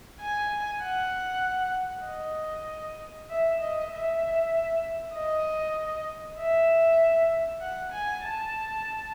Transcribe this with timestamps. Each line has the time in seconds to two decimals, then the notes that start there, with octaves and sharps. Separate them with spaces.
0.21 G#5
0.83 F#5
2.06 D#5
3.30 E5
3.60 D#5
3.92 E5
5.14 D#5
6.39 E5
7.61 F#5
7.92 G#5
8.23 A5